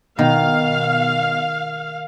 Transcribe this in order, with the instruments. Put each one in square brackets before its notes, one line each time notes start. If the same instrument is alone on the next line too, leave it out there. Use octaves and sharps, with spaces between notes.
[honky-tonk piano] B2 [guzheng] D#3 [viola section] F5